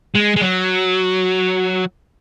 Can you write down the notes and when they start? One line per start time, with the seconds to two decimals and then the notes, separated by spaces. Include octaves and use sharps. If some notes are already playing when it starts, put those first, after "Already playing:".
0.15 G#3
0.36 G#3
0.41 F#3